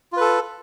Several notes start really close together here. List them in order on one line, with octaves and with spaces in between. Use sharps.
F4 B4 A4